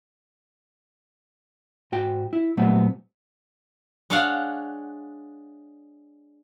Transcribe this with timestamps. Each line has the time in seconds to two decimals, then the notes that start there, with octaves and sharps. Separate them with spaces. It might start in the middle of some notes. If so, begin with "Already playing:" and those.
1.92 G#2 F#4 G5
2.33 E4
2.57 A#2 F#3 G3 A3 B3 C4
4.10 G#3 D4 C#5 D5 F5 F#5